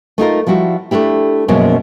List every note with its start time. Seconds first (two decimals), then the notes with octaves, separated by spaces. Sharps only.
0.18 A3 D#4 F4 A#4
0.46 F3 G3 E4 F#4
0.91 A3 A#3 D4 E4 G4
1.48 F#2 B2 F3 G#3 A#3 C#4